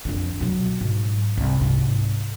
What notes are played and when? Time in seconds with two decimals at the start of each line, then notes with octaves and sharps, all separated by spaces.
0.05 F2 D3
0.41 B2 F#3
0.81 G#2
1.37 C2
1.61 G#2 C3